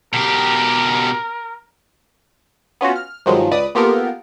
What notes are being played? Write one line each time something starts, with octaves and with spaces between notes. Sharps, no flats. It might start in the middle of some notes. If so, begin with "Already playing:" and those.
B2 G4 A#4
B3 C#4 F4 F#4
F6
G2 D#3 F3 F#3 G#3
C#2 B4 D5 D#6
A#3 B3 F4 G4 A4 A#4